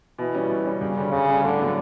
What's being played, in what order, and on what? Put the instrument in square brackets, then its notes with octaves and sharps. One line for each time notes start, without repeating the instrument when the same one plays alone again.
[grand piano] B2 [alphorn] E3
[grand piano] G3 C#4
B2
G3 C#4
[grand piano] G2 [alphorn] C#3
[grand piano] D3 G3 C#4
[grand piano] G2 [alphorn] C#3
[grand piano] D3 G3 C#4
[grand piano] A2 [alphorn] D3
[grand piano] F#3 B3 D4